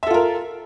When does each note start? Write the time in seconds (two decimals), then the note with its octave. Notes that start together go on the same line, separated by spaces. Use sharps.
0.03 E5
0.07 A4
0.10 F4
0.14 A#4